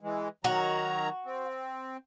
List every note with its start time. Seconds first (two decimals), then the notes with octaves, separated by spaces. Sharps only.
0.01 E3 G#3
0.44 D#3 F#3 F#4 A#5
1.25 C4